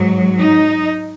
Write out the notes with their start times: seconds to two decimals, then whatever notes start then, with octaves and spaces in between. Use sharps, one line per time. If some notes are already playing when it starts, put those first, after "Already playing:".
Already playing: G#2 F#3
0.40 D#4